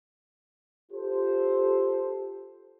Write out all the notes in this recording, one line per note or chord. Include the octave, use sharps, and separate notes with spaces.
F4 G4 A4 C5